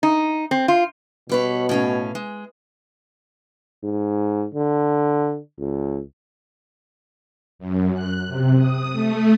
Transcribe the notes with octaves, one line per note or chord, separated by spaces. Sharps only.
D#4
C4
F4
B2 G3 B4 C#5
A2 C#4 F5
G#3
G#2
D3
C#2
F#2
F#6
C3
D#6
A3